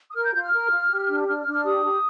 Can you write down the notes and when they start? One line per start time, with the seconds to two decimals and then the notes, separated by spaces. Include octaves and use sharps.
0.10 D#6
0.15 A#4 F6
0.24 G6
0.34 F4 G6
0.43 F6
0.54 A#4
0.71 F4
0.90 G4
1.09 D4
1.28 D4 F6
1.40 F6
1.46 D4
1.53 F6
1.65 G4 D#6
1.85 G4